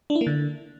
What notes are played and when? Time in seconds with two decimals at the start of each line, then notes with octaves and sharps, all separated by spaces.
0.10 D4
0.15 E4
0.21 A#3
0.27 D3